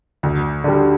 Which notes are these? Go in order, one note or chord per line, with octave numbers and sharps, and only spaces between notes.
D2
D3 G3